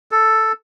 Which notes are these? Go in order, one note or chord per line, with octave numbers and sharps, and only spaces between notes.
A4